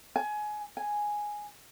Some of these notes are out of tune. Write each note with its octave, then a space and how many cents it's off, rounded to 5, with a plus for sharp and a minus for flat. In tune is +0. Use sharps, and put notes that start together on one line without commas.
G#5 +20
G#5 +0